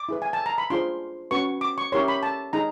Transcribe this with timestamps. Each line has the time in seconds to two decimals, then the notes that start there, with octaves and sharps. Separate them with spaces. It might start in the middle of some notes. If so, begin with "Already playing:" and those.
Already playing: D6
0.09 E4 G#4 B4
0.22 G#5
0.33 A5
0.46 A#5
0.58 B5
0.70 D4 F4 G#4 C5 C6
1.31 C#4 F#4 B4 C#6
1.61 D6
1.78 C#6
1.92 C#4 E4 G4 A#4 C#5 C6
2.08 B5
2.23 A5
2.53 D#4 G#4 A#5